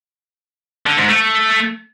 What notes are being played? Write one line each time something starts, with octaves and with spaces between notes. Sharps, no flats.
D3
G#2
A3